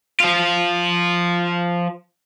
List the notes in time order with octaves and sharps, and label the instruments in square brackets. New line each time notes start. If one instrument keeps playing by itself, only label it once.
[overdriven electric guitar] F3 F4